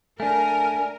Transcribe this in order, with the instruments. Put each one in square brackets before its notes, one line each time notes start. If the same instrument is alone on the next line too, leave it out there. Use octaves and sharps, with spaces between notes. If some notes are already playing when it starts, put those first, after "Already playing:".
[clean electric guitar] A3 D4 [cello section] A#4 [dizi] G#5